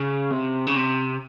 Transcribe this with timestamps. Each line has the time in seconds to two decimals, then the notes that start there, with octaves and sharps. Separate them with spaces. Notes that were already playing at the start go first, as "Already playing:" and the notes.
Already playing: C#3
0.31 C3
0.67 C#3
0.76 C3